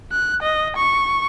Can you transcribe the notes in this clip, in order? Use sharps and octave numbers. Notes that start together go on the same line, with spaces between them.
F#6
D#5
C#6